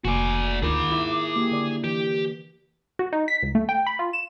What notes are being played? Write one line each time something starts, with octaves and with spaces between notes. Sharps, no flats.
F1 A#3 F#4 D5 G#5
D2 D#3 F4 G#4 A#4 B5 D6
E4
A#3 G4
D3 D5
E3 G4
F#4
D#4
B6
C#2
A3
G5
B5
F4
E7